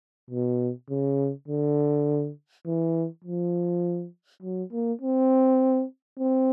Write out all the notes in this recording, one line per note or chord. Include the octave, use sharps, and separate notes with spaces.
B2
C#3
D3
E3
F3
F#3
A#3
C4
C4